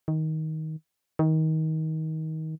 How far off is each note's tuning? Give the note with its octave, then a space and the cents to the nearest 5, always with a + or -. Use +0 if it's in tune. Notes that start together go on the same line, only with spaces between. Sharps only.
D#3 +15
D#3 +25